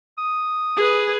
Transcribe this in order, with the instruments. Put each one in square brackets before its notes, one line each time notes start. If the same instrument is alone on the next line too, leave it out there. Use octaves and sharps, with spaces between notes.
[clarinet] D#6
[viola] G#4 B4